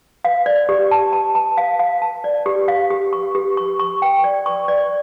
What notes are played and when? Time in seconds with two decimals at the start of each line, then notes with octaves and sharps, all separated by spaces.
0.25 F5
0.46 D5
0.69 G4
0.91 A5
1.13 A5
1.35 A5
1.57 F5
1.79 F5
2.02 A5
2.24 D5
2.46 G4
2.68 F5
2.91 G4
3.13 C#6
3.35 G4
3.57 C#6
3.79 C#6
4.02 G5
4.24 D5
4.46 C#6
4.68 D5